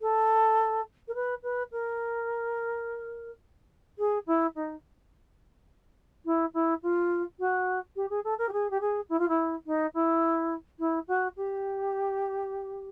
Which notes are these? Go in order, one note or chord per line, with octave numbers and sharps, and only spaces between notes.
A4
A#4
B4
B4
A#4
G#4
E4
D#4
E4
E4
F4
F#4
G4
G#4
A4
A#4
G4
G#4
G4
G#4
E4
F4
E4
D#4
E4
E4
F#4
G4